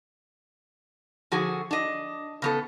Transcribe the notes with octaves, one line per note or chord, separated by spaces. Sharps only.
D3 F3 F#4 G#4
D4 D#5
C#3 B3 A4